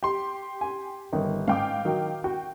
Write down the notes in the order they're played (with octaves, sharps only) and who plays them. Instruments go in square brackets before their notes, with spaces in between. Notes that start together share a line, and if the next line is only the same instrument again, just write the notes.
[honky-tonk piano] G4 C6
[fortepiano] G#5
[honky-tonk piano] G1 [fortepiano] D#3
[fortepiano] G#2 [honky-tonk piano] F5 G5 D6
[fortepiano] D#3 F#3
[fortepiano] F#4 [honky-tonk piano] G5